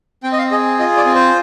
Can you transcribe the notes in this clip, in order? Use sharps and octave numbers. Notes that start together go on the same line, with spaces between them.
C4 G5
D#5
F5
G#4 D#5
F4 D#5
D5
C4
C5